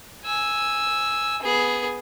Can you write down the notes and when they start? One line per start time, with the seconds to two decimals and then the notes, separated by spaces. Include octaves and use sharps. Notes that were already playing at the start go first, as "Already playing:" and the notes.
0.25 G#5 E6
1.42 B3 G#4